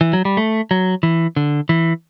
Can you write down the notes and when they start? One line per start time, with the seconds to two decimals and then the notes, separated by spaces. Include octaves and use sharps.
0.01 E3
0.13 F#3
0.25 G3
0.37 A3
0.71 F#3
1.03 E3
1.36 D3
1.69 E3